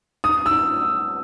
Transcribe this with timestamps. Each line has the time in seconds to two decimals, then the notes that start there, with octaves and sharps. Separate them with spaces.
0.24 D#6
0.46 E6